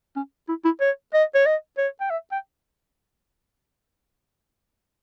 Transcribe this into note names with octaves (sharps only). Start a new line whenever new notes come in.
C#4
E4
E4
C#5
D#5
C#5
D#5
C#5
G5
E5
G5